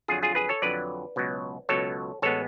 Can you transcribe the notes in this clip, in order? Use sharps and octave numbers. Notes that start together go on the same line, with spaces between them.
F2 D3 F#3 F4 G#4
F4 G#4
G#4 B4
A4 C#5
F2 D3 F#3 B4 D5
C#2 B2 F#3
C#2 B2 F#3 A4 C#5
A1 G#3 B3 A4 C#5